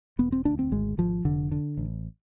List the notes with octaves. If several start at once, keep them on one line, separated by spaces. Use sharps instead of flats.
E1 B3
C4
D2 D4
C4
G#1 G#3
G#1 F3
F1 D3
D3
A1